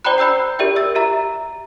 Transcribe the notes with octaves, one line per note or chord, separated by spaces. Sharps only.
C5 D5 G5 A#5 B5 F#6
G5 B5 E6 G6 C7
G4 A#4 D5 E5 G5
E6 A6
G4 E5 A#5